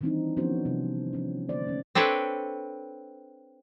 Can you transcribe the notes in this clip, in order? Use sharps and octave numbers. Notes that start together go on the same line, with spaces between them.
D#3 E3 G3 C4 D4 D#4
F3 B3 C#4 D4 F#4 C5
C3 G3
F3 C#4
D3 A#3 C5 D5
A3 C#4
C4 D4 A4 B4 C#5